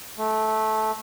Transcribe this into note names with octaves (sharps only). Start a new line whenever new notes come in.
A3